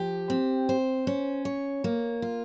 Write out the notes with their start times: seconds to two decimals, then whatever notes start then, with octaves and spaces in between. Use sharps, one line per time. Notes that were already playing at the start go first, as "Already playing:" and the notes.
Already playing: F3 G4
0.30 C4
0.69 C5
1.07 C#4
1.45 C#5
1.84 A#3
2.22 F4